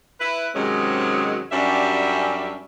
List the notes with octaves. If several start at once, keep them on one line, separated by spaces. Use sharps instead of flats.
E4 B4
G#2 C3 D#3 F#3 G#3 C#4
F#2 G3 C#4 D4 G4 E5